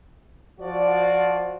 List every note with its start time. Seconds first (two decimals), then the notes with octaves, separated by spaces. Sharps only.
0.60 F3 F#4 D5